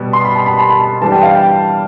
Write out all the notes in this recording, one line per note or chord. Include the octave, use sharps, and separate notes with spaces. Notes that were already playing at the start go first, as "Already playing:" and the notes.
Already playing: B2 G3 B3
C6
B5
A5
B5
A5
B5
A5
E3 G3 D4 A5
G5
F5
G5